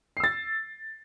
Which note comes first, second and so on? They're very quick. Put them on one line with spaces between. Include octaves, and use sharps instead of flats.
C7 E6 A6